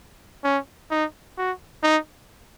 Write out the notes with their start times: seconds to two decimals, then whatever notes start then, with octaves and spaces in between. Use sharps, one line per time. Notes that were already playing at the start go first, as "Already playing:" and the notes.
0.44 C#4
0.91 D#4
1.37 F#4
1.83 D#4